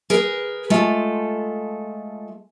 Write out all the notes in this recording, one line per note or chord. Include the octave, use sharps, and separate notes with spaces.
G#4 A#4 B4
G#3 A3 F4 A4